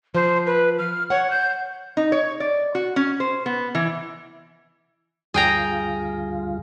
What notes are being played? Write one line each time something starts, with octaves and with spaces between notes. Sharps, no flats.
F3 C5
B4
F6
C#5 F#5
G6
D#4
C#5
D5
F#4
C#4
C5
B3
E3
D2 G2 F4 G#4 G5 A#5